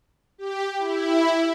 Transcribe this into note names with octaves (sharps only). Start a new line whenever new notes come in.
G4
E4